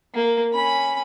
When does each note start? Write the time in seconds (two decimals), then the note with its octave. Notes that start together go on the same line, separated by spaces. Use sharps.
0.14 A#3
0.53 C#4 B5